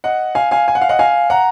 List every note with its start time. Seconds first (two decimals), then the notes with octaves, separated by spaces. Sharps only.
0.04 D#5 F#5
0.35 F5 G#5
0.51 F5 G#5
0.68 G#5
0.75 F#5
0.81 F5
0.89 D#5 F#5
0.99 F5 G#5
1.30 F#5 A#5